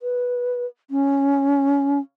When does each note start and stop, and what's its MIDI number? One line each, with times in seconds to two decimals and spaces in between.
0.01 0.66 71
0.91 1.99 61